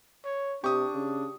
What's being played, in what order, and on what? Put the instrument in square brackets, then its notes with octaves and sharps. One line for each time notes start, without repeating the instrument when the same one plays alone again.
[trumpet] C#5
[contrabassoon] C3 [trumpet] D4 [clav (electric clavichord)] G4 [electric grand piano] C#6 D#6
[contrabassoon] C#3